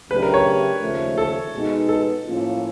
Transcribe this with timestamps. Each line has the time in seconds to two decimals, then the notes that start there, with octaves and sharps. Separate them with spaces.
0.11 C#3 F#3 A3 D4 G4 B4
0.23 A#4
0.34 C#5
0.81 D#2 C#3 F3 A3
1.18 A4
1.53 B2 G#3 B3 D#4
1.89 A4
2.24 A2 F3 A#3 C#4 F4